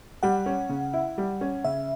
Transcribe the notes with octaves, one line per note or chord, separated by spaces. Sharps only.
G3 F#5
C#4
C#3
E4
G3
C#4
C#3 E5